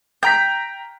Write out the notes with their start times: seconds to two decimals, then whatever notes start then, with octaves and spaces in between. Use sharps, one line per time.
0.23 G5 A#5 G6 B6